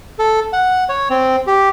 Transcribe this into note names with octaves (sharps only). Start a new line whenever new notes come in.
A4
F#5
C#5
C4
G4